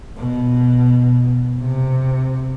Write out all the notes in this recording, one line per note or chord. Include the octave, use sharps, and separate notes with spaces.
B2
C3